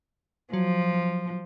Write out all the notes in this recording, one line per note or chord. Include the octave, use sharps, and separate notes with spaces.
F3 F#3